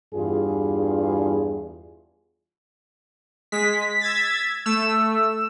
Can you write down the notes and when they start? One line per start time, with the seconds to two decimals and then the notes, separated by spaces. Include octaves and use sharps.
0.15 E2 G2 F4 G#4
3.52 G#3 B6
4.01 E6 G#6 A6
4.66 A3 E6